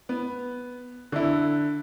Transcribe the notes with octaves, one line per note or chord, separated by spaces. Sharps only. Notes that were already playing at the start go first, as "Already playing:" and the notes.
B3
D3 E4